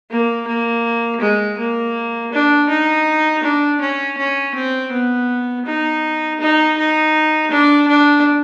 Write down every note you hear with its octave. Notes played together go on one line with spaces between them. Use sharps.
A#3
A#3
G#3
A#3
D4
D#4
D4
C#4
C#4
C4
B3
D#4
D#4
D#4
D4
D4